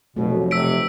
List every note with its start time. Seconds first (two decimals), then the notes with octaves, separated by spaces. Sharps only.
0.16 F1 B2 F#3 A3
0.51 C3 E6 B6 D7